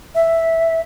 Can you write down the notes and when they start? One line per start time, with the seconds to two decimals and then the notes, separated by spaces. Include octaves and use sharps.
0.15 E5